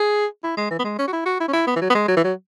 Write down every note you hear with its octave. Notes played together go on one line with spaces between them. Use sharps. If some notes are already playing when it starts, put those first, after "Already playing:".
Already playing: G#4
E4
G#3
E3
B3
G#3
C#4
F#4
E4
F#4
E4
C#4
E4
B3
E3
F#3
B3
G#3
F#3
E3
F#3